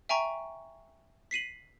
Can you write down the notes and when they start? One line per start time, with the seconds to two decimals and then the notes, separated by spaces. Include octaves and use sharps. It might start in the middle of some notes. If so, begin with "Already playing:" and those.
0.09 E5 G5 G#5 A#5 C#6
1.31 B6 C7 D#7 F#7